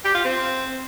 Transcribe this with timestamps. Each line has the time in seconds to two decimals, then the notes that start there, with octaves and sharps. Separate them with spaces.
0.05 G4
0.15 F4
0.24 C4